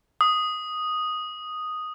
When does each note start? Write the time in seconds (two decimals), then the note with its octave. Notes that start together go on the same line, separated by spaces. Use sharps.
0.21 D#6